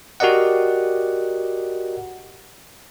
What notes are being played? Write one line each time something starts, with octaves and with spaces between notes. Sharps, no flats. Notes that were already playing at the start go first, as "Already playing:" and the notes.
F#4 G4 A#4 D5 D#5 F#5